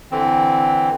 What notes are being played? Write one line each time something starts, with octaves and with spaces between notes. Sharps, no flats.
D3 E3 C4